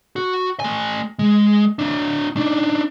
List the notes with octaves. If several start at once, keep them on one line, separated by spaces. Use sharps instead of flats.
F#4
A3 G#5
G#3
D4 E4
D4 D#4